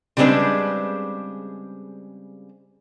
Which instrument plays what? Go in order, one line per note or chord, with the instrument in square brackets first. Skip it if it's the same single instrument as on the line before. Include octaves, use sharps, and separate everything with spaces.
[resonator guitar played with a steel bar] C#3 G3 G#3 C4 D4 B4